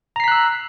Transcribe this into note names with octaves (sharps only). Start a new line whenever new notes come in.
A#5 E6 F#6 B6 C7